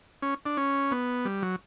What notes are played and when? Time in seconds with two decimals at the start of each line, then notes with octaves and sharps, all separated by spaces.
0.22 C#4
0.46 D4
0.57 C#4
0.91 B3
1.25 G3
1.42 F#3